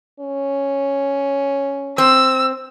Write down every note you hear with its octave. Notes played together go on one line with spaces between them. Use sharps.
C#4
C4 E6